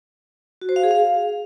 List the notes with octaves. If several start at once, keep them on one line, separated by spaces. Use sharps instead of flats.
F#4
C5
F5
G#4
F5